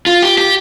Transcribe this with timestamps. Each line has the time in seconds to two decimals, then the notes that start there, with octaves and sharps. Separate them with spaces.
0.07 F4
0.23 G4
0.38 G4